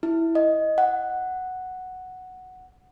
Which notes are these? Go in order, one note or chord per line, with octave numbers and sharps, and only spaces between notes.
E4
D#5
F#5